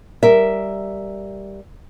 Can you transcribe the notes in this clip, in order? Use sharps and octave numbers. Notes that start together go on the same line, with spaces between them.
G3 A#4 E5